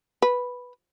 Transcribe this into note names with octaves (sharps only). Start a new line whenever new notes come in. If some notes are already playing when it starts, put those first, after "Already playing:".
B4